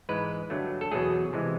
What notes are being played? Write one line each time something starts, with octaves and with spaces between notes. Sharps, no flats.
G#2 E3 G#3 B4
G2 D3 F#3 A3
A4
E2 B2 F#3 A3 G#4
C3 E3 G#3